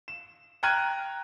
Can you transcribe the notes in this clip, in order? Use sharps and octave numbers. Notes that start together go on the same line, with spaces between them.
E7
G5 A#5 F6 F#6 G#6 D#7